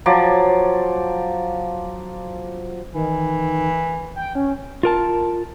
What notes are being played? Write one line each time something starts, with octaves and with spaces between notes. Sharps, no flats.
F3 F#3 D5
D#3 E3
G5
C#4
F4 A#4 A5